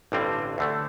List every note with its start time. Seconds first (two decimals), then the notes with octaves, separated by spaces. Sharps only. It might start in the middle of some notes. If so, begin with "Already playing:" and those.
0.12 A1 G2 D3 G3 C4
0.58 D2 D3 A3